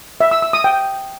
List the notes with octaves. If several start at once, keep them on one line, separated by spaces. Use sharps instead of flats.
E5
E6
E6
D#6
G5